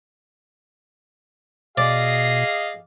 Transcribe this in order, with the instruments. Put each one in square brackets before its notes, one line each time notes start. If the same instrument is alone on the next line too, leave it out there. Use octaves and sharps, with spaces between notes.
[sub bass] B2 [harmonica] G#4 D#5 F5 [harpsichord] D5